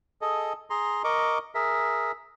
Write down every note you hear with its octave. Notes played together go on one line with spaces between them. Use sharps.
G#4 A4 D#5
G#4 A#5 C6
A#4 D#5 C#6 D6
G#4 A#4 E5